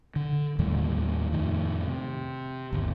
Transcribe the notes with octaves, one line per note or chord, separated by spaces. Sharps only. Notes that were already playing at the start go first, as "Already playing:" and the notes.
D3
D#2 A2 D#3 G3
F2 A2 D#3
C3
G1 D#2